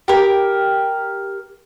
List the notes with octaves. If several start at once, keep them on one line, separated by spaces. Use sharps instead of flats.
G4 A#4